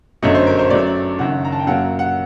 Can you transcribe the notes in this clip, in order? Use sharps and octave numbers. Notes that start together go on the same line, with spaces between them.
G1 F#2 F#3 A3 D#5
C5
A#4
C5
F#2 F#3 A3 D5
F#1 F#2 D#3 F#5
A#5
A5
G5
F#2 F#3 A#3 F#5
F#5